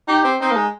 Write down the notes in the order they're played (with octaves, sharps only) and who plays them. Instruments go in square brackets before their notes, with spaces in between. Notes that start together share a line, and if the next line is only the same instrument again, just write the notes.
[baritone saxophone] D#4 [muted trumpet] G4
[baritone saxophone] C4
[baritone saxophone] C4 [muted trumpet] D#4
[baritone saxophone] A#3
G#3